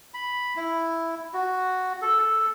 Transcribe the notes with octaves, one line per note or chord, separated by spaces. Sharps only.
B5
E4
F#4
A4
A4